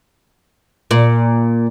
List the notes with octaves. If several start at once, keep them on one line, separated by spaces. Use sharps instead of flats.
A#2